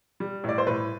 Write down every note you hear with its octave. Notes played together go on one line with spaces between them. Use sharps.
G3
A2 D5
C5
A2 B4